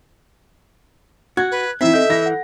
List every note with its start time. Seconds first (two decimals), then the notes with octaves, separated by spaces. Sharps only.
1.37 F#4 F#6 G#6
1.51 B4
1.81 E3 C4 D#4 E4 E5 B6
1.94 A4 D#5 G6
2.10 E3 A#6
2.26 F#5